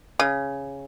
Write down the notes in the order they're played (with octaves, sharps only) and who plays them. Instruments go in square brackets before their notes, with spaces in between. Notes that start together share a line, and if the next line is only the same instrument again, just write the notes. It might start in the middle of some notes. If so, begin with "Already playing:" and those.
[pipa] C#3